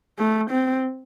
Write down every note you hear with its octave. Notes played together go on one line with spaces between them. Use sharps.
A3
C4